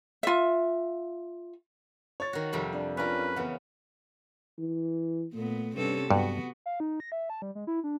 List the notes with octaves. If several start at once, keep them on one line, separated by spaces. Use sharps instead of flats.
F4 E5
C#5 A6
D#3 F#4
F2 C3 G3
D4
C#4 D4 F4 A#4 B4
C#3 E3 B3 F#5
E3
A#2 A3 B3
G2 C3 C#4 A4
G2 F#3 B3 F#4
F5
D#4
A#6
E5
A5
G3
G#3
E4
D4